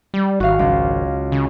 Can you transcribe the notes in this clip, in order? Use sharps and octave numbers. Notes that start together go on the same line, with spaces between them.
G3
G#1 F#4 F5
C#2
C#3